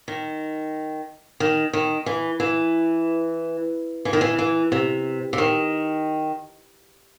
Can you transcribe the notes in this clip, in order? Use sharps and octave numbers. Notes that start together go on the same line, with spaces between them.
D#3
D#3
D#3
E3
E3
E3
D#3
E3
E3
C3
C3
D#3